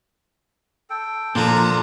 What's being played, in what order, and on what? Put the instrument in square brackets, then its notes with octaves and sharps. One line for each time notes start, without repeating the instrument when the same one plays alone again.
[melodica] A4 G5
[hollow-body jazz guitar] A#2 [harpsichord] D3 F3 [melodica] D4 F4 [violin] A4 A#5